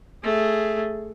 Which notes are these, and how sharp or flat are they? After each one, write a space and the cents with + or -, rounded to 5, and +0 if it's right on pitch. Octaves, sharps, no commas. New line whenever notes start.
A3 +0 G#4 +0